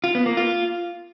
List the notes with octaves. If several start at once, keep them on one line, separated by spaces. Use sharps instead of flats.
F4
B3
A#3
F4